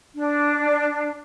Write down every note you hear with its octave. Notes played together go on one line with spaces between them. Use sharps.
D4